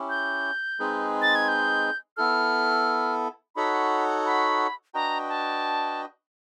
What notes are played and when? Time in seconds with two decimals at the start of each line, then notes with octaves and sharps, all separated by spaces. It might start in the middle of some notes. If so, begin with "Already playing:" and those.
Already playing: C#4 E4 G4
0.10 G6
0.79 G#3 C4 D#4 G#4 B4
1.22 A6
1.35 G#6
1.48 G6
2.17 B3 E4 A4 F6
3.56 D#4 F#4 A4 C#5 F#5 B5
4.26 B5
4.94 D4 F#4 B4 D#5 G5 A#5
5.28 A5